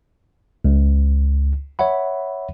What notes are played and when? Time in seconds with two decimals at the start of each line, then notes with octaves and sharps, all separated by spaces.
0.65 C#2
1.79 C#5 E5 F#5 B5